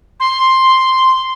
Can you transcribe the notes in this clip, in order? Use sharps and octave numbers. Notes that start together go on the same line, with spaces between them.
C6